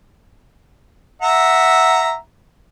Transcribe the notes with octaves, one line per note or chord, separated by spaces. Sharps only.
E5 F#5 A#5